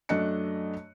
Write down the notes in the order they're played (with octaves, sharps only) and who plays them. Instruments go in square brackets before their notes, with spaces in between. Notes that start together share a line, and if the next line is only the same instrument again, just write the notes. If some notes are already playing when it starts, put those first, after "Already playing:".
[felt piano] F#2 A3 D4 D#5 F#6 C#7